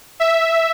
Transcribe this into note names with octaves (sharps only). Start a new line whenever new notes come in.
E5